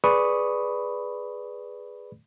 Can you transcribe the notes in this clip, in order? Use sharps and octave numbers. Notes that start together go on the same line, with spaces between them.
G#4 B4 D5 B5 C#6 D#6